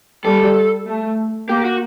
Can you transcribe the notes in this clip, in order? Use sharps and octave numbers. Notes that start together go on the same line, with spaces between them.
G3 A4
A3
A#3 G4
F#4